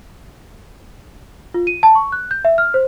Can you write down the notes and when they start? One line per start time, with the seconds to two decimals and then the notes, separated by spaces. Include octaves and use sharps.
1.54 F4
1.67 D#7
1.83 A5
1.95 C#6
2.12 F#6
2.31 G6
2.45 E5
2.58 F6
2.74 C5